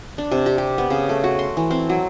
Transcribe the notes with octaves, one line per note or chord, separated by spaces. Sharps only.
D4
C3
G4
G4
B3
C#3
A3
F#4
C6
E3
C4
F#3